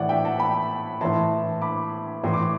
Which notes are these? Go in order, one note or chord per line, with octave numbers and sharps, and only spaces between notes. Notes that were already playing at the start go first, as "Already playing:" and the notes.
Already playing: A2 E3 D5 F#5
E5 G5
F#5 A5
G5 B5
A2 E3 A5 C6
B5 D6
A2 E3 C6
D6